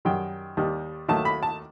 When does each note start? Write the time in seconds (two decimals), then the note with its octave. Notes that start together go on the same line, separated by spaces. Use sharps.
0.05 F#2 D#3 G3 G5
0.57 D#2 D#3 G3
1.09 D#2 D#3 F#3 A3 A5
1.25 B5
1.43 A5